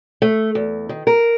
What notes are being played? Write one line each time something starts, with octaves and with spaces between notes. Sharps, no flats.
A3
E2
D#3
A#4